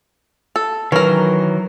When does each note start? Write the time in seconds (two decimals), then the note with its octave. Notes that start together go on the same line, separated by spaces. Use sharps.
0.56 A4
0.92 D#3 E3 F#3 C#4 A#4 B4